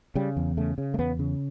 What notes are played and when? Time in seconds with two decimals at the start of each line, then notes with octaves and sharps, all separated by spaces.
0.15 C#3 G3
0.37 E2
0.57 C#3 A3
0.78 C#3
0.94 A3
0.98 E2 B3
1.19 C#3